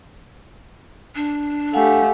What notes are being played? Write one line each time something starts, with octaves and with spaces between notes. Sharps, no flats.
D4
A3 G4 F5 F#5 G#5